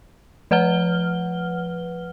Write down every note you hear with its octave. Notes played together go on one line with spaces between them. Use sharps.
F3 B4 F#5 F6 G7